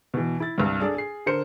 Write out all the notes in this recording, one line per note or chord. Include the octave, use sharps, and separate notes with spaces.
B2 E3
E4 A6
C2 G2
D4 G#4 A4 D5
G#4 C7
D3 A#4 C5 C#7